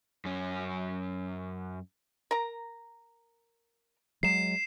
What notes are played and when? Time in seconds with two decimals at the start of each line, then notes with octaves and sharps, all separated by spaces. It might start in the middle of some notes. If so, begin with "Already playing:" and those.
0.25 F#2 C#4
2.31 A#4 A#5
4.23 F#3 G#3 C7 E7